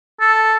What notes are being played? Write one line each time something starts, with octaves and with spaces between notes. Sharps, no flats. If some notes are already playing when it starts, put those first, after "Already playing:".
A4